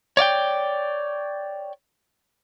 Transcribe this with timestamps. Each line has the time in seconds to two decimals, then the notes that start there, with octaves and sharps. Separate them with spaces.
0.17 C#5 D5 F5 G5